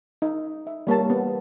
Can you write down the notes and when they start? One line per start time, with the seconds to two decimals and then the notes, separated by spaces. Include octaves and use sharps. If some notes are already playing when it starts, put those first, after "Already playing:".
0.22 D#4
0.67 E5
0.87 G3 A#3 C#5 A5
1.10 B3